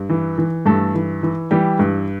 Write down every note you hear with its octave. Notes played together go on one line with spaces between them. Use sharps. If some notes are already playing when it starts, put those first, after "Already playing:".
Already playing: G2
E3
E3
G2 A3 A4
E3
E3
E3 G3 G4
G2